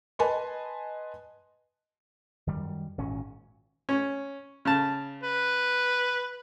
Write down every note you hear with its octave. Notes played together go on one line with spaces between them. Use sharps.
B4 D#5 G#5 A5 B5 C6
F#2 D#3 G3
G#1 A#2 C#4
C#4
C#3 A5
B4